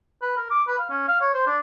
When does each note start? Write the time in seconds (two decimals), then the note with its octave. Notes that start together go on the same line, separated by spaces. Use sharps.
0.22 B4
0.37 A#4
0.50 D6
0.67 B4
0.79 F5
0.90 C#4
1.08 F5
1.21 C#5
1.34 C5
1.47 D4